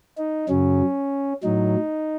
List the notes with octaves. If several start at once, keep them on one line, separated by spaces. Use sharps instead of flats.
D#4
F#2 C#3 F#3 C#4
A2 F#3 D#4